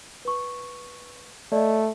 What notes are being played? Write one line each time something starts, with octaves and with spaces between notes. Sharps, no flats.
B4 C#6
A3 D5 D#5